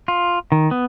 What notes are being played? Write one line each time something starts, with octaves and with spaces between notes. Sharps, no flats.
F4
D#3
B3